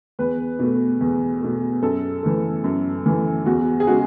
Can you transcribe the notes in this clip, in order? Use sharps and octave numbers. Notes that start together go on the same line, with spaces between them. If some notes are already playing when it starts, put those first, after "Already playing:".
E2 B4
B2 A3
E2
B2 A3
F#2 A4
E3 A3
F#2
E3 A3
E2 F#4
G#4
C#3 G#3 F#4